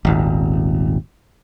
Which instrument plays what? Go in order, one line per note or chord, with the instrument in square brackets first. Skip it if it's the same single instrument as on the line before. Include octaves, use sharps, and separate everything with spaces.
[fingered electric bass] D#1 G#1